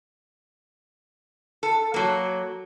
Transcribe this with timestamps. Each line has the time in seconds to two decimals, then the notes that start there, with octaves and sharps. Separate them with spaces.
1.63 A4
1.94 F#3 A#3